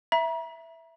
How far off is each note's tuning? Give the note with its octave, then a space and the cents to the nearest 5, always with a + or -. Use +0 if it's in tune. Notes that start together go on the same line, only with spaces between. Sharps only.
E5 +0 A#5 +40